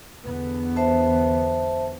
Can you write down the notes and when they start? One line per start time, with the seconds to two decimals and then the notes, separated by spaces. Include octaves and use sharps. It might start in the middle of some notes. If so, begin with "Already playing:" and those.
0.24 E2 D3 B3
0.76 C5 E5 A5